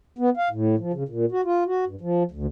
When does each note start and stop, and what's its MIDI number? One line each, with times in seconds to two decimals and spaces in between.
0.18 0.30 59
0.37 0.49 77
0.51 0.75 45
0.79 0.92 53
0.93 1.03 49
1.09 1.26 46
1.32 1.41 66
1.45 1.64 65
1.66 1.85 66
1.86 1.96 43
2.01 2.23 53
2.31 2.46 38